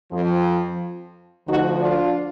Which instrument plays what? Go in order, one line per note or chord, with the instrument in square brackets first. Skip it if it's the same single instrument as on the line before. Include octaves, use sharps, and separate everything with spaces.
[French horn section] F2 F3
D2 D3 F3 D#4 F#4
D4 F4